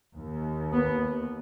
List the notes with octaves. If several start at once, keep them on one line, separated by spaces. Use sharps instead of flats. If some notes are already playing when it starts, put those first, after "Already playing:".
D#2
B3